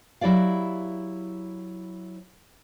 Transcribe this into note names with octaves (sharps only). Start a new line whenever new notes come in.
F#3 E4 G4 D5 F5